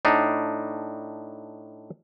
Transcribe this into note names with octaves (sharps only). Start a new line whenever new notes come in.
A2 D4 D#4